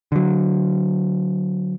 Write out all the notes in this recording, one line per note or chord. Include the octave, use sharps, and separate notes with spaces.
D3 F#3